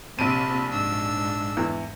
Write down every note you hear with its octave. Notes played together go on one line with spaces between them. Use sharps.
A#1 C3 C4 A5 B5 D7 D#7
G#2 D4 E6
E2 E3